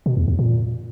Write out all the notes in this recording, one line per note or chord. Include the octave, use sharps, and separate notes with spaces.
B2
E2
E2
A#2